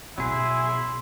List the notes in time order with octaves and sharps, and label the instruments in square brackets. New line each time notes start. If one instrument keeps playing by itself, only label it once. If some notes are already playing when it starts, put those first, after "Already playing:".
[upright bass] B2 [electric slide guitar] F#3 G#4 [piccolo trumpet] E4 [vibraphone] C6